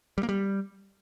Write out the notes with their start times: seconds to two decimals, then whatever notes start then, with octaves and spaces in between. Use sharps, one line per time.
0.18 G3
0.23 A#3
0.29 G3